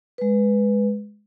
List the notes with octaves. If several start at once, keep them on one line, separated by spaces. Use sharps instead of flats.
G#3 B4